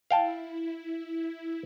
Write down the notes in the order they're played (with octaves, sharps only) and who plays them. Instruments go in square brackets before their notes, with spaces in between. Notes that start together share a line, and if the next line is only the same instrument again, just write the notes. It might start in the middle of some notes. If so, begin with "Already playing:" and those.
[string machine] E4 [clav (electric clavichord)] F5 G5 A5